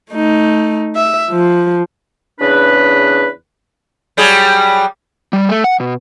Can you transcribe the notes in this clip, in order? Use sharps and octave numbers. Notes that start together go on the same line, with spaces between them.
A3 D#4
E5
F3
E2 C#3 D4 B4
F#3 G3 G#4
G3
A3
F#5
B2